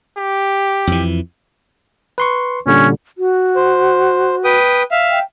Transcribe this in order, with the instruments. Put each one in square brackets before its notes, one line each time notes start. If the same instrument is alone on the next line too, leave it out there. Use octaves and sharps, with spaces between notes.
[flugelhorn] G4
[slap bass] F2 E3
[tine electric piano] B4 C6 C#6
[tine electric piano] A#2 D3 G3 [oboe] C#4
[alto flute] F#4
[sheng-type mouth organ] C5
B4 G5 D#6
E5 F5
[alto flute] G5